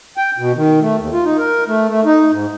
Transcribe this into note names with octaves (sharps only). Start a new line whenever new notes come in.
G5
B2
D#3
A3
D#2
F4
D#4
A#4
A3
A3
D#4
G#2